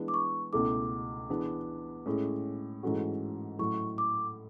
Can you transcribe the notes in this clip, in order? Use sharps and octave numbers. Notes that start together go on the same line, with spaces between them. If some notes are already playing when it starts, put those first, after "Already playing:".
Already playing: E3 G#3 B3 D4
D6
C#6
C#2 B2 A3 E4 A4 D6
E3 B3 D4 G#4 B4
A2 G#3 C#4 G#4
G#2 E3 A3 C#4 F#4
A2 F#3 A3 C#6
D6